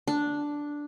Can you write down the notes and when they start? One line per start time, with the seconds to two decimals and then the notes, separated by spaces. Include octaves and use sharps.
0.08 D4